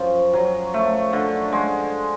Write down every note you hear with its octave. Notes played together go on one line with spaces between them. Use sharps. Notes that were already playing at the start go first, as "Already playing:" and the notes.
Already playing: F#2 F3
F#3
A3
D3
G#3